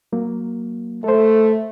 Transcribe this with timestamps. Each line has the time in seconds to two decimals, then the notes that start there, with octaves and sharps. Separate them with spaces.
0.13 F#3 A#3
1.04 A3 A4 C5